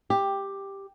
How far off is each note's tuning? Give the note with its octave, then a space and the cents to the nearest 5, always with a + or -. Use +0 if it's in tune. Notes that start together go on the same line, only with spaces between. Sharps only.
G4 +5